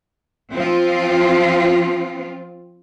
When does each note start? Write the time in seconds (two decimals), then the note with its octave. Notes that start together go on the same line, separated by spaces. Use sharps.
0.54 F3 C4 F4